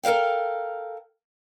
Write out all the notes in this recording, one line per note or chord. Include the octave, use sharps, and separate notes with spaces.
A4 A#4 C5 F5 G5